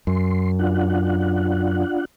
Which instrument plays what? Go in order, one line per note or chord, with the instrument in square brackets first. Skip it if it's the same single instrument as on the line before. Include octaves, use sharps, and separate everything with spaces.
[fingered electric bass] F#2 [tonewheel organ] C6
[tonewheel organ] D4 F4 F#5